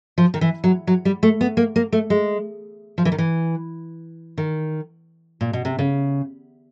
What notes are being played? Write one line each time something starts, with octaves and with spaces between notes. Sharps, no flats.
F3
D#3
E3
F#3
F#3
G3
A3
B3
A#3
A#3
A3
G#3
F3
E3
D#3
E3
D#3
A#2
B2
C3
C#3